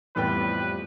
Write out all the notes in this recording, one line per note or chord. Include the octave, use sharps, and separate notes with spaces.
A1 F2 A2 G3 B3 B4 G5